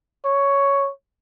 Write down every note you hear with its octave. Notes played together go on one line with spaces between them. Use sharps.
C#5